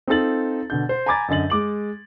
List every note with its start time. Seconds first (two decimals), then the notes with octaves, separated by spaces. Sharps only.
0.08 C4 D#4 F4 A4 A6 F#7
0.70 B2 D3 G6
0.89 C5
1.06 G#5 A#5 B5 D6 G#6 A6
1.28 F#2 D3 D#5 A6 F#7
1.50 G#3 D6 F#7